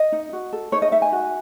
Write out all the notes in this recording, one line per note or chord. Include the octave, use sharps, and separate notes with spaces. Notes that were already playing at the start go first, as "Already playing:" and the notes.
Already playing: D#5
D#4
F#4
A4
D#4 C#5
D#5
D#4 E5
G#5
F#4